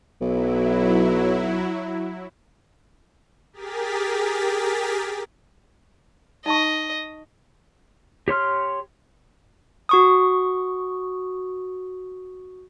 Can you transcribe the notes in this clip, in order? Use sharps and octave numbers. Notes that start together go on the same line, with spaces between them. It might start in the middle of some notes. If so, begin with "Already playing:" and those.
B1 F#3 E4
G4 G#4 A#4 A6 B6
D#4 D#5 A5 C#6
G4 C#5 C6 F6
F#4 C#6 D#6